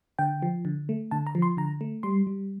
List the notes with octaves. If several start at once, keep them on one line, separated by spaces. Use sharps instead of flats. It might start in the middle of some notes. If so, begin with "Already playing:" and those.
D3 G5
F3
D3
A3
D3 A5
A#5
F3
C6
D3 A#5
A3
G3 C6
G3